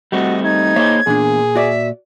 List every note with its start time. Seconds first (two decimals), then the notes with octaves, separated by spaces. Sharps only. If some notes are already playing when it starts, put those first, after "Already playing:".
0.12 G3 A3 C4 F#4 D#5
0.44 D#4 G#6
0.76 A#3 G#4 C5 C#5 E5
1.07 E2 A#2 D4 G#4
1.56 F#4 D5 E5